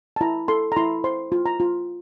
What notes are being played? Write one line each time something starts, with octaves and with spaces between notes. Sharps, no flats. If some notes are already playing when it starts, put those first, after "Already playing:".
A5
E4 A#5
A4 C6
A#5
E4 C6
C5 C6
F4
A#5
F4